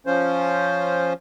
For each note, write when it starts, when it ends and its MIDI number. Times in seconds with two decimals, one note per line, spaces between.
0.06 1.13 53
0.06 1.13 61
0.06 1.13 65
0.06 1.13 72